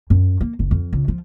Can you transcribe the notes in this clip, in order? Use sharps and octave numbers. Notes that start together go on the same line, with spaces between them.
F#2
A#3
F#1
F2
C#2
F3